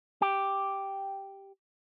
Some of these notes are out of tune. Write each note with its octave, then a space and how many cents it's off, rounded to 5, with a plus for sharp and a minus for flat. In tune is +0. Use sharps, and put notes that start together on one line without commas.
G4 +0